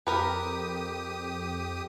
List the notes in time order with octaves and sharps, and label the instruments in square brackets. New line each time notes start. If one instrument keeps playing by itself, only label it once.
[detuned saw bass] F2 [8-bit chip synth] G4 D#6 [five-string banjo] A#4 B4